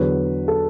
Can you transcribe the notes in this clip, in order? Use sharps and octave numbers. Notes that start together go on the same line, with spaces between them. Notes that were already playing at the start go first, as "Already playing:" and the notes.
Already playing: E2 D3 F#3 B4
A4